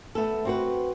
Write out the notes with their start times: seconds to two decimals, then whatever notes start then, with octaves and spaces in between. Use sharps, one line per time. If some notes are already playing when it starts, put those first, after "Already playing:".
0.15 A3 B3 A4
0.45 C4 F#4 B4